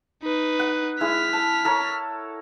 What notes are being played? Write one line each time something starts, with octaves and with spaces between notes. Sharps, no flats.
D#4 B4
F#5
G#3 E4 F6 B6
A5
A4 A#4 C#5